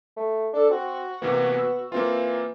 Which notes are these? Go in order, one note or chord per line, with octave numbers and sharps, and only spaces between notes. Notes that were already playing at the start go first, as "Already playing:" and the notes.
A3
D4 A4
C4 F#4
C3 E3 A#3 B3
E6
E3 A#3 C4 F4